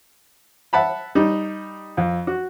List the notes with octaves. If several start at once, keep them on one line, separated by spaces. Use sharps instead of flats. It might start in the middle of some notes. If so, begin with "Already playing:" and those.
E5 F#5 A5 B5
G3 D#4
F2
F#4